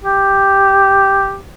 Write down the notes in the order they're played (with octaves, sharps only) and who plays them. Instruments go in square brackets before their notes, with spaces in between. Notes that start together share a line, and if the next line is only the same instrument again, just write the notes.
[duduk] G4